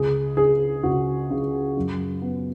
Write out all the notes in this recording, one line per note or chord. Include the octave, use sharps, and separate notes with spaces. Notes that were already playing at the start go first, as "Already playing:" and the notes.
Already playing: C#2 G#4
C#3 G#4
C#2 F#4
C#3
F#2
B3